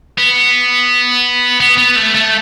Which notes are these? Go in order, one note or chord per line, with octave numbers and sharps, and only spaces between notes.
B3
B3
B3
A3
A3